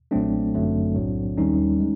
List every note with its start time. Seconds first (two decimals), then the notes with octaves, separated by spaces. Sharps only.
0.11 B1 A#2 F#3 A3 C4 D4
0.54 G1 F#2 D3 F#3 A3
0.96 B1 A2 F#3
1.38 D#2 D#3 G3 C#4 D#4
1.80 G#3